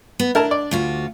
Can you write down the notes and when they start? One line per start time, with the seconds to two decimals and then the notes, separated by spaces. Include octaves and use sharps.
0.20 B3
0.35 D4 E4 A#4 A5
0.51 D5
0.71 D2 F4 F#4